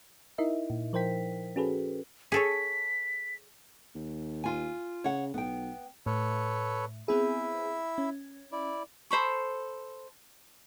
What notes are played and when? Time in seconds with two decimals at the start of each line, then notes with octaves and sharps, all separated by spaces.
0.38 D#4 E4 A#4 D#5 E5
0.70 A#2
0.93 F3 A#4 C5 G5 B6
1.56 C#4 F#4 G#4 A4 B4
2.32 G#4 A4 C#5 B6
3.95 D#2
4.44 F4 G#5
5.04 C#3 C#5 F#5
5.34 B1 B3 G5
6.06 A2 A4 B4 C#5
7.08 B3 C4 E4 G#4 E5
7.98 C#4
8.52 E4 D5
9.11 A4 C5 B5 C#6